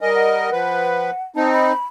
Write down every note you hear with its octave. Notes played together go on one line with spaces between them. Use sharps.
G3 A#4 D#5 G#5
F#5
F3 B4
C4 D#4 A5
B5